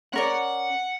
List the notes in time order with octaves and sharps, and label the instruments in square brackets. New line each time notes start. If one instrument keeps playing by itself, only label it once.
[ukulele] C#4 A#4 D5 [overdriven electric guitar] F#5